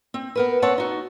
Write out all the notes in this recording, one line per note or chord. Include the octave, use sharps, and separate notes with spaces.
C4
B3 A#4 B4
C4 C#5 F#5 A5
D#4 F#4